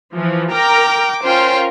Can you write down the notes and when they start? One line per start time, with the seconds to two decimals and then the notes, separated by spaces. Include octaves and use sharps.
0.14 E3 F3
0.53 A#4 G5 A#5 D6
1.23 C#4 F4 A#4 C5 G5